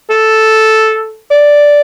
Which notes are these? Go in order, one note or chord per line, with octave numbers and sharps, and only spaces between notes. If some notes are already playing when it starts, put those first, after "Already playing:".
A4
D5